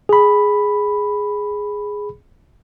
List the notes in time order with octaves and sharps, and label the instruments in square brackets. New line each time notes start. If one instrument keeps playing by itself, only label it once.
[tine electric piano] G#4 B5